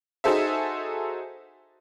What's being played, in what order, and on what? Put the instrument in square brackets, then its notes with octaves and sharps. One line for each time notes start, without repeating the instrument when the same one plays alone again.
[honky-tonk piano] D#4 F#4 G#4 A4 C5 E5